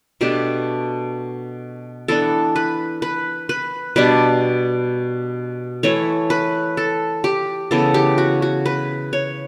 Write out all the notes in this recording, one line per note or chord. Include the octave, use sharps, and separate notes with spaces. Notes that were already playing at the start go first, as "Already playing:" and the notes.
B2 A3 D4 G4
E3 B3 D4 A4
B4
B4
B4
B2 G3 D4 B4
E3 A3 E4 C#5
B4
A4
G4
C#3 E3 B3 A4
G4
F#4
F#4
B4
C#5